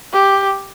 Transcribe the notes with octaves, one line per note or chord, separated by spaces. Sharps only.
G4